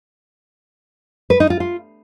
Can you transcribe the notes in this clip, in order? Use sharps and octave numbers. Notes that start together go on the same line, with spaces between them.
B4
D#4
F4
F4